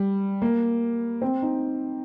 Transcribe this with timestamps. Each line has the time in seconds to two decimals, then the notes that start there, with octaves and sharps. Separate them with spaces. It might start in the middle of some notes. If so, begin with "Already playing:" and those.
Already playing: G3
0.42 A#3
1.22 C4
1.42 D#4